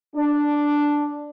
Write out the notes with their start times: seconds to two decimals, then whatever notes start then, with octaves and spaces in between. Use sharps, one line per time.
0.15 D4